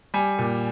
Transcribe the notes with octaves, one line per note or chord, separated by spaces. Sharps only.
G3 G#5
A#2